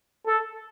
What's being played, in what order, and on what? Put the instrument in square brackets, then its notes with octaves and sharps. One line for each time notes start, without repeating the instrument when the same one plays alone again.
[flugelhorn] A4